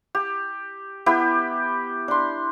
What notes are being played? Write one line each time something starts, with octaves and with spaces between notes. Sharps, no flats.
G4
B3 E4 G4
D4 C6